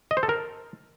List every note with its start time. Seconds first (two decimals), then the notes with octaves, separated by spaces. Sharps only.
0.11 D#5
0.17 C5
0.23 A4
0.29 A#4